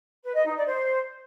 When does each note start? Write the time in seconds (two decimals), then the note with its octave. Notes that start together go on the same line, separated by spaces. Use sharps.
0.23 B4
0.34 D#5
0.45 D#4
0.55 D5
0.66 C5